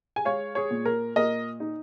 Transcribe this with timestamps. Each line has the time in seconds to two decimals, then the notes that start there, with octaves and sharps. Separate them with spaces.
0.16 G#5
0.25 G#3 C#5 F5
0.55 G#4 C#5
0.71 A#2
0.85 A#4
1.16 A#2 A#4 D#5
1.60 D#4